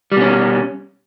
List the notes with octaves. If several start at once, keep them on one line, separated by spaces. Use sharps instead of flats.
B2 G3 C#4